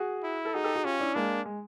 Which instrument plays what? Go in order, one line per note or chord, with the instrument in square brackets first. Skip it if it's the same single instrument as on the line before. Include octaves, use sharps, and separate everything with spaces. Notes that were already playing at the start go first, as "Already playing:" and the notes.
Already playing: [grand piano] F#4 G#4
[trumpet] E4
[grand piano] A4
[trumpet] D#4 [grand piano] F#4 G#4
[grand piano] G4 A4
F#4 G#4
[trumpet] C#4 [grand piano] F4 G4
[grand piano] D4 E4
[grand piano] G#3 A#3 [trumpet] D4
[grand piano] G#3